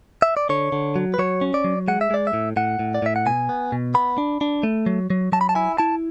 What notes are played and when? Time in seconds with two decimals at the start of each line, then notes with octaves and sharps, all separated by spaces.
0.22 E5
0.37 D5
0.49 D3 C#5
0.72 D3
0.96 F#3
1.14 B4
1.19 F#3 C#5
1.41 C#4
1.54 D5
1.64 F#3
1.88 G#3 F#5
2.01 E5
2.11 G#3 D5
2.27 E5
2.33 A2
2.56 A2 F#5
2.79 A2
2.95 D5
3.02 A2 E5
3.16 F#5
3.26 B2 G#5
3.49 B3
3.72 B2
3.95 B3 B5
4.18 D4
4.41 D4
4.63 A3
4.86 F#3
5.10 F#3
5.32 F#3 A5
5.41 B5
5.49 A5
5.55 E4 G#5
5.78 E4 A5